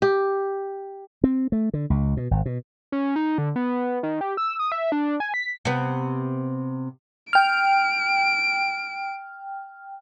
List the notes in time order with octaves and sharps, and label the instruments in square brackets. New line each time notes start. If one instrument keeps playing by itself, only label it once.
[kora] G4
[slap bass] C4
A3
D3
C#2
B2
G#1
B2
[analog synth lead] C#4
D#4
D3
B3
D#3
G4
E6
D#6
E5
D4
G#5
B6
[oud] C3 B3
[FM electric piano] G5 F6 [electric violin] D7